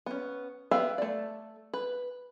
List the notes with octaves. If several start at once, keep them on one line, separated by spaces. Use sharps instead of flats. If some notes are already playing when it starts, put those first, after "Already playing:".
B3 C#4
B3 G4 B4 E5 F5
A3 D5
B4